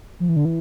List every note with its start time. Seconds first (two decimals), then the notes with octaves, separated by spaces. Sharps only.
0.20 F3
0.29 E3
0.36 D3
0.45 E3